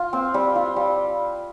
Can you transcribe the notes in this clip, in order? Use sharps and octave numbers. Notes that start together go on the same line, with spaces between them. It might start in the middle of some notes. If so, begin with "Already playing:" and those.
Already playing: F4
C4
G3
F4
G3